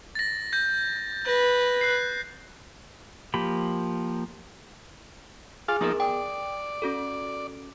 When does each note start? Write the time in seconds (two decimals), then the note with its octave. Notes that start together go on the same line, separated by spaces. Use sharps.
0.15 A6 A#6
0.53 G6 A#6
1.25 B4 G6 A#6
1.81 F#6 C7
3.34 F3 A#3 G4 B5
5.68 F4 G#4 F5 G#5 D6
5.81 F3 A#3 B3 D#4 G#4 A#4
6.00 D5 G5 D#6
6.82 C#4 F#4 A4